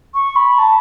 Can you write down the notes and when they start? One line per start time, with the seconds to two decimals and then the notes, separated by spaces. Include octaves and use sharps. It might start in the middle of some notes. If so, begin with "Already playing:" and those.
0.14 C#6
0.36 B5
0.58 A5